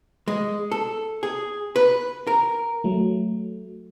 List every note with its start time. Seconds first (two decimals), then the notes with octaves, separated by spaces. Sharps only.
0.28 G#3
0.72 A4
1.23 G#4
1.76 B4
2.27 A#4
2.84 F#3 A3